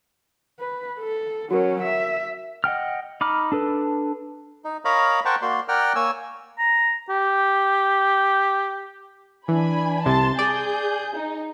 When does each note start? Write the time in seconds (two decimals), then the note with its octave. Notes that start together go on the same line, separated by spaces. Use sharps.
0.60 B4
0.99 A4
1.51 F#3 C#4 F#4 A#4
1.82 E5
2.64 D#5 F#5 G5 F6
3.21 D#4 B5 D6 F6
3.52 D4 A4 B4
4.65 D#4
4.85 A#4 C#5 D#5 F5 A#5 B5
5.25 A#4 C5 F#5 G5 A5 C#6
5.42 A#3 F#4 D5 C6
5.68 A#4 D5 F#5 G5 F6
5.95 A#3 C#5 G#5 E6
6.58 A#5
7.09 G4
9.48 E3 D4 G#5 B5
10.06 C2 C3 A5 C6 A6
10.39 G#4 D5 G6
11.16 D#4